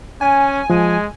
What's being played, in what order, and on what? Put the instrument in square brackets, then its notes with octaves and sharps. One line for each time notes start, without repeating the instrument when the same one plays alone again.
[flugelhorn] C#4 [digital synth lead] G#5
[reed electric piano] F3 [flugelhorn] G#3